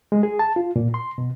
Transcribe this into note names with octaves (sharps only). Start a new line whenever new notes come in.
G#3
G#4
A5
F4
A#2
C6
B2